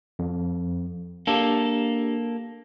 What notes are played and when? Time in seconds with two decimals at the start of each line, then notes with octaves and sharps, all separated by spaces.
0.19 F2
1.27 A#3 D4 G4 A4